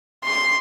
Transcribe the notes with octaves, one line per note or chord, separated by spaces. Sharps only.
C6